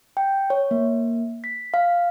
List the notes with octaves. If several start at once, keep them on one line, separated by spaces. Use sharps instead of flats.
G5
C#5
A#3
B6
F5